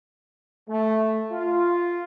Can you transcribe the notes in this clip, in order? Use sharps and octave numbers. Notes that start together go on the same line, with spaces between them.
A3
F4